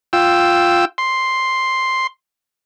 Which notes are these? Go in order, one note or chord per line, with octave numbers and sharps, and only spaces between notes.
F4 G5 E6
C6